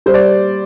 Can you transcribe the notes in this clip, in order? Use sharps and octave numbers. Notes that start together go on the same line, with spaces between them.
G3 C5
D5